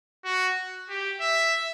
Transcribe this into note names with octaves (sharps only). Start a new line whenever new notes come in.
F#4
G4
E5